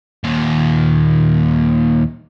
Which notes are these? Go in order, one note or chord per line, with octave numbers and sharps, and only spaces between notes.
D#2 A#2